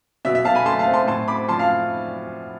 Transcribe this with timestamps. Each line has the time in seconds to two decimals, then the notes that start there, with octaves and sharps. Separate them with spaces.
0.25 B2 E5
0.35 E5
0.45 B2 F5 A5
0.55 G#5 B5
0.65 A3 A5 C6
0.79 F5 A5
0.87 C4
0.93 A5 C6
1.07 A2 A5 C6
1.28 C4 B5 D6
1.48 F3 A5 C6
1.59 F5 A5